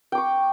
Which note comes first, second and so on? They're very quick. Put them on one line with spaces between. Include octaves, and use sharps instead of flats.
G5 D6 C#6